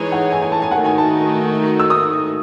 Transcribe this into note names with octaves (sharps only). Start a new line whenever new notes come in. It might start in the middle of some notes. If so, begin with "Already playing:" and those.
Already playing: E3 G#3 D#4 G#4 C#5
F#5
G#5
G#5
A5
G#5
D#3 A3 D#4 F#4 F#5
G#5
A5
E6
D#6